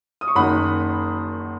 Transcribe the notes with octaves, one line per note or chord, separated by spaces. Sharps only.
D#6
C#6
F#1 F#2 D#3 F#5 B5